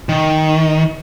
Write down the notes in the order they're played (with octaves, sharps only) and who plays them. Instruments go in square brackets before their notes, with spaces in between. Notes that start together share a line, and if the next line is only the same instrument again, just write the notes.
[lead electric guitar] D#3